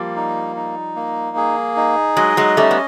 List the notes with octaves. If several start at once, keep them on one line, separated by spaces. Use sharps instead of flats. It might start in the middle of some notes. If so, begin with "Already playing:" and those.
Already playing: F3 G3 A#3
D#4
D#4
A#3
G#4
D#4
F#3 G#3 D#5
F#3 G#3
G3 A3 C#4
B3